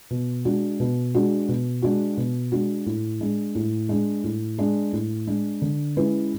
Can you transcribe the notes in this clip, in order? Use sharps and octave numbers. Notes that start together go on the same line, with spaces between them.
B2
G#3 D4 F#4
B2
G#3 D4 F#4
B2
G#3 D4 F#4
B2
G#3 D4 F#4
A2
G#3 D4
A2
G#3 D4
A2
G#3 D4
A2
G#3 D4
D3
G#3 C#4 E4 B4